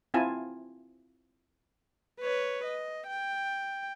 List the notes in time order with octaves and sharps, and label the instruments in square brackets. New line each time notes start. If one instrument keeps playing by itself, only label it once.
[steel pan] C4 E4 F4 G#5 A5
[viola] B4 C#5
D#5
G5